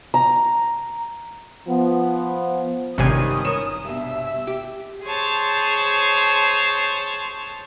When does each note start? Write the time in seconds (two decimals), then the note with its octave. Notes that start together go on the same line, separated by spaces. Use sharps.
0.14 A#5
1.67 F3 B3
2.98 G#1 G2 C3 D#3 C#4 C#5 G#5 D#6
3.45 A#4 C#5 E7
3.85 G2 B2 E5
4.47 G4
5.04 G#4 C5 C#5 A5